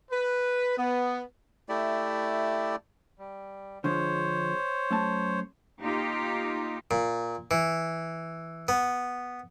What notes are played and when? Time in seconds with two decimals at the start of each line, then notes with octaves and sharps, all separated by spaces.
0.11 B4
0.78 B3
1.69 A3 E4 G4 D5
3.19 G3
3.84 D3 F3 G#3 C5 C#5
4.91 F#2 A3 A5
5.82 A#3 D#4 F4 G4
6.91 A#2
7.51 E3
8.68 B3